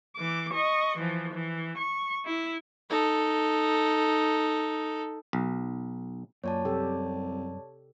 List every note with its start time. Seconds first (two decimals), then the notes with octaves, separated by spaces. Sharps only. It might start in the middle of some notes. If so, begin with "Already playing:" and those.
0.16 E3 D6
0.53 D#5 C#6
0.97 E3 F3
1.33 E3
1.78 C#6
2.25 E4
2.90 D#4 A4
5.33 B1
6.44 F#2 A#2 C#5 D5 A5
6.65 C2 C3 G4 A4